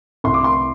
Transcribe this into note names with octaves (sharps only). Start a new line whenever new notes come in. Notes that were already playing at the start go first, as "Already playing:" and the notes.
C2 C6
D6
C6